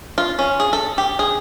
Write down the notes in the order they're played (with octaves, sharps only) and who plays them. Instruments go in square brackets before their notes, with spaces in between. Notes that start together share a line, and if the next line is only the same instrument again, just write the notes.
[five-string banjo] F4
C#4
G#4
A4
G4
G#4